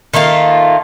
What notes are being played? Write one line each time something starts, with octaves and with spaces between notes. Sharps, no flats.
D#3 A3 A#3 F4